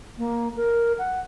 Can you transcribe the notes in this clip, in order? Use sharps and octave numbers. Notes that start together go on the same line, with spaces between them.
A#3
A#4
F#5